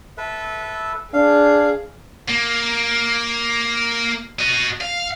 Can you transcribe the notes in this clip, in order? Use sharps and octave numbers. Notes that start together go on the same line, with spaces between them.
A4 B4 E5
D4 G#4 F5
A#3
F#4 D#5
F5